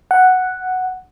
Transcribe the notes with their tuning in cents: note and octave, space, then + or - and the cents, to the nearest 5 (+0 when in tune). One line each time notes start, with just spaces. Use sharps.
F#5 +0